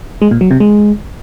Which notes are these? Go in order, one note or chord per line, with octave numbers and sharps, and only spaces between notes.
G#3
A#2
F#3
C3
G#3